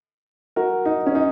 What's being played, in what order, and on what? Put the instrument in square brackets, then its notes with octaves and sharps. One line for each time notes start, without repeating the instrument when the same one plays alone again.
[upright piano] F#4 A#4
D#4
C#4
D#4